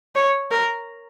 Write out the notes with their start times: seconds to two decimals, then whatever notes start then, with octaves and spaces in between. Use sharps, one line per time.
0.15 C#5
0.51 A#4